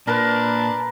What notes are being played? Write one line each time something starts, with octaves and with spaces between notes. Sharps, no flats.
A#2 D4 A#4 B4